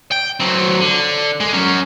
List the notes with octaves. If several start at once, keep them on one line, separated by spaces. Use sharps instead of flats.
G5
F#3 C4
D3
G#3
F#3 C#4